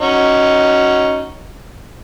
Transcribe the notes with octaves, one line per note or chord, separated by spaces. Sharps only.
C#4 D#4 F#4